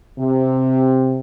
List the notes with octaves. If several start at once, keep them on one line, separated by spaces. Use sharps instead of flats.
C3